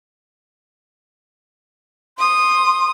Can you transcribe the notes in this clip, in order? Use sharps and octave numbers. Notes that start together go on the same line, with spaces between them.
C6 D#6